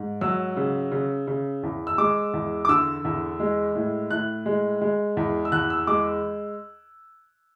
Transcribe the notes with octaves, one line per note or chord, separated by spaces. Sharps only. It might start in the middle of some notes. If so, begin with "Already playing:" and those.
Already playing: G#2
F#3 E6
C#3
C#3
C#3
E2
E6
G#3 D6
E2
D6
D3 E6
E2
G#3
A2
A2 F#6
G#3
G#3
E2
E6
E2 F#6
E6
G#3 D6